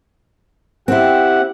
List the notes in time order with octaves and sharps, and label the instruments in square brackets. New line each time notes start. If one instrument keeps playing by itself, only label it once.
[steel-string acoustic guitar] C4 E4 [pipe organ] G4 F#5